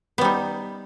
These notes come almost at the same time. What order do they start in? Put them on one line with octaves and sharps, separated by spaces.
B3 G3 D#4